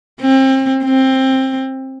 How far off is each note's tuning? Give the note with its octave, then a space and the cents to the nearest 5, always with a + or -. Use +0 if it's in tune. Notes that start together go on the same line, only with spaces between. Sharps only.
C4 +30
C4 +15